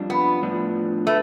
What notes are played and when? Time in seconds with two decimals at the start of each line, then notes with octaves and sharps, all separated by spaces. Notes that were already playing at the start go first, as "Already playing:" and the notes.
Already playing: F2 G3 D4 F4
0.10 B3
0.42 A2 F3 B3 D4
1.07 A3 B4